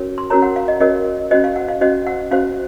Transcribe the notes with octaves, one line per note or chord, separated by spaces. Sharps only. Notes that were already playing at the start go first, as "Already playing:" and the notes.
Already playing: C#4 F#4 A#4 C#5
C6
C#4 F#4 A#4 C#5 A#5
F#5
F5
D#5
C#4 F#4 A#4 C#5 D#5
C#4 F#4 C5 D#5
F5
F#5
F5
C#4 F#4 C5 D#5
F#5
C#4 F#4 C5 F5